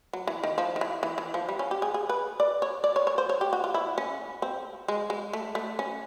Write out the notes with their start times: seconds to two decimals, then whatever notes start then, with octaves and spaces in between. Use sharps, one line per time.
0.13 F#3
0.27 E3
0.43 D#3
0.58 F3
0.76 D#3
0.81 E3
1.03 E3
1.18 E3
1.34 F3
1.49 G3
1.59 C#4
1.71 G4
1.82 G#4
1.94 G#4
2.09 B4
2.40 D5
2.62 C#5
2.84 D5
2.96 C#5
3.07 C#5
3.18 C5
3.29 C#5
3.41 G4
3.53 F#4
3.64 F4
3.74 E4
3.98 C#4
4.42 C4
4.88 G#3
5.10 G#3
5.33 A3
5.55 A3
5.79 C#4